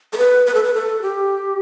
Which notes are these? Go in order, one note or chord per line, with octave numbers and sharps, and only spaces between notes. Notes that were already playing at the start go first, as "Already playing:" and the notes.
A4
B4
B4
A4
B4
A4
G4